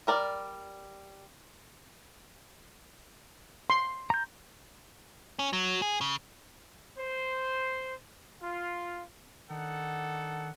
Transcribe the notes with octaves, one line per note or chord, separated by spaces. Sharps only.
G3 A#4 D5
C6
A#5 G6
C#4
F#3
G#4
C#3
C5
F4
D#3 D4 D#4 A4 F#5